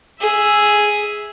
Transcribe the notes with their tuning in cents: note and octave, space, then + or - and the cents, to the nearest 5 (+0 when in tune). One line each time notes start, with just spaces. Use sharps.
G#4 +0 E5 +0